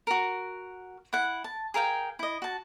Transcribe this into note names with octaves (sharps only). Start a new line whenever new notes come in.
F#4 A#4
E4 F#5
A5
G#4 A#4 F5 G5
E4 D#5
F#4 A5